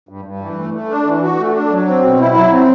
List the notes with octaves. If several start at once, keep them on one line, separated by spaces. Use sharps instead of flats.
G2
G2
E3
A3
A3
D4
E3
F#4
A3
D4
F#3
C4
B2
E4
F#3
C4